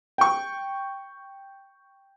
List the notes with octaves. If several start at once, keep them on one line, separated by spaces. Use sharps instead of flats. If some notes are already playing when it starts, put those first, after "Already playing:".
G5 C#6